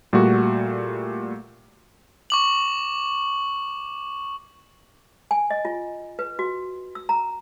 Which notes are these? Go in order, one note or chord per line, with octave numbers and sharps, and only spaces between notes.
A#2 G3 A3 F#4
C#6 D6 F#7
G#5
D#5
F4
B4
F#4
E6
A#5